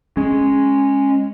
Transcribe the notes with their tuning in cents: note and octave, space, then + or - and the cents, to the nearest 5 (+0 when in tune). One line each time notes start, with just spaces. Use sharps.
G#3 +0 C#4 -10